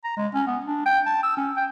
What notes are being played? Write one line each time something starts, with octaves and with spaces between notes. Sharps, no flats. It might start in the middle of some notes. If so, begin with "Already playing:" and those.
A#5
G#3
C#4
B3
D4
G5
A5
E6
C#4
G5